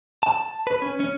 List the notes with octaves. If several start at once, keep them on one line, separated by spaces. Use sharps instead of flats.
A5
B4
C#4
C#4